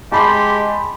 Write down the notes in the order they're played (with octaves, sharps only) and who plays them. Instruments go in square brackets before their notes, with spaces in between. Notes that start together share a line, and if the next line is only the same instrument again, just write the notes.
[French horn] G#3 [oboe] G4 [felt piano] A5 B5 C6